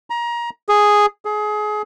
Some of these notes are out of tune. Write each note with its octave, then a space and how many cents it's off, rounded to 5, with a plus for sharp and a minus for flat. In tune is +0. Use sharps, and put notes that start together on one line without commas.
A#5 +25
G#4 +0
G#4 +25